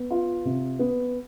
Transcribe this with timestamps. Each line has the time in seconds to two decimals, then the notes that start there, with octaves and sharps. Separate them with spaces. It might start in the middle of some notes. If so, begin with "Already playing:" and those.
Already playing: B3
0.11 F4
0.45 C3
0.79 B3